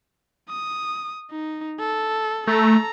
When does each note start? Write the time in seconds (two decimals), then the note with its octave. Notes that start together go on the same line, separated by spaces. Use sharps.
0.49 D#6
1.31 D#4
1.79 A4
2.47 A3 A4 A#5